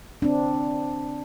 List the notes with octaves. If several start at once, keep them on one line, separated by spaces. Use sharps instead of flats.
C4 D4